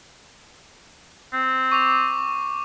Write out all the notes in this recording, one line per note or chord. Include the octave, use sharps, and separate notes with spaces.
C4
C#6 D6 F7